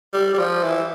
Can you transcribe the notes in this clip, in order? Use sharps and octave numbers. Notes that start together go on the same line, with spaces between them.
G3
G3
F3
E3